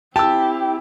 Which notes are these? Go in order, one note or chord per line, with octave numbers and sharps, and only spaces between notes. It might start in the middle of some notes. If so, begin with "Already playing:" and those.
C4 E4 G4 A5 E6